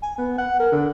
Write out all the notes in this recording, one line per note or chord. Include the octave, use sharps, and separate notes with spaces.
G#5
B3
F#5
A#4
D3